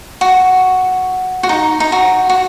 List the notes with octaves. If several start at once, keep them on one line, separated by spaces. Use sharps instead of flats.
F#4
F#4
D#4
D#4
F#4
F#4